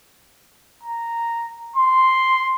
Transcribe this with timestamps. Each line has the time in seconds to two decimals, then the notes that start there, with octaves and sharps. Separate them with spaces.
0.83 A#5
1.76 C6